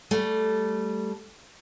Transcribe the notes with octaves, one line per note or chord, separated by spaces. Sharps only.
G3 A3